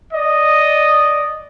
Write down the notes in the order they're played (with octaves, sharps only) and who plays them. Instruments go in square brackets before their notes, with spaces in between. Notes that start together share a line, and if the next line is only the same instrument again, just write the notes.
[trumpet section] D5 D#5